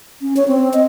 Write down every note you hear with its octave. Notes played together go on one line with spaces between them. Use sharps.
C#4
C#5
C4
D#5